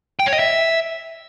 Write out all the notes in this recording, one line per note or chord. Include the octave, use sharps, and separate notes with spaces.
G5
C#5
D#5
E5